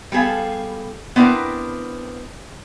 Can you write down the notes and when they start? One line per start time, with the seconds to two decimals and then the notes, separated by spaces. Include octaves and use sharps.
0.12 G3 B3 G#4 A4 F5
1.16 B3 C4 D4 E4 A#4 B4